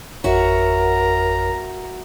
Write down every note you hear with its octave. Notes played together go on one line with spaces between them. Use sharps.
G#1 F2 F#4 A#4 C#5 E5 F#5 A#5